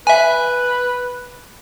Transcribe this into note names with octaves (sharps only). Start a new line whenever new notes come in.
B4 E5 G#5